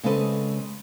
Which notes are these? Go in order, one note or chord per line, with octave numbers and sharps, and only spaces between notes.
C#3 G#3 C4 A4 B4 D#5